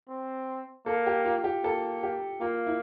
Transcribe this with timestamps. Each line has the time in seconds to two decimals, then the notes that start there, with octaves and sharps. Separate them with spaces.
0.09 C4
0.86 A#3 A4
1.06 G4
1.25 F4
1.44 G4
1.64 A#3 A4
2.03 G4
2.41 A#3 F4
2.67 E4